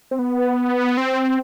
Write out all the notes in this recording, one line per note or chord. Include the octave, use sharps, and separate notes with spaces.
C4
B3
C4